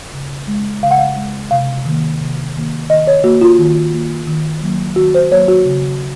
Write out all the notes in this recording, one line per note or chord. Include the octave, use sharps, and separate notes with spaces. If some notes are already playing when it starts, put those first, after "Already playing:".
C#3
G#3
C#3 F5
F#5
F5
G#3
C3 F5
D#3 A#3
C3
D#3 A#3
D#3 D#5
C#5
A#3 F#4
F4
D#3
A#3
D#3
F#3 A#3
D#3 F#4
C5
F#3 A#3 C#5
F#4
C#3